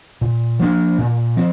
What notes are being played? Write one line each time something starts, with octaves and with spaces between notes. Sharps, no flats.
A#2
F3 A#3 D4
A#2
F3 C4